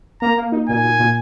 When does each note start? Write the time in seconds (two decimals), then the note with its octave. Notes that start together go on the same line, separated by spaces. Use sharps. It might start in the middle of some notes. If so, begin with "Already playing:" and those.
0.21 A#3 A#5
0.37 A#3
0.52 D#4
0.68 A#2 G#5
0.84 A#2
0.99 A#2